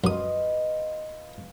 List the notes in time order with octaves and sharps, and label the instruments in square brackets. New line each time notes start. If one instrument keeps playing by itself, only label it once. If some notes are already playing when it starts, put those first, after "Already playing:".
[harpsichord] F#2 D#6 [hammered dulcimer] F4 B4 D#5